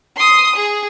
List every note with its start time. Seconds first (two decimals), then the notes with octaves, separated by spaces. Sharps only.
0.17 C6 D#6
0.56 G#4